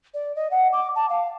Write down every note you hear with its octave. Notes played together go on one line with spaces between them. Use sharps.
D5
D#5
F#5
D6
A5
F5